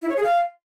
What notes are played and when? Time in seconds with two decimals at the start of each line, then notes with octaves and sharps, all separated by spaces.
0.02 E4
0.09 C#5
0.16 G#4
0.23 F5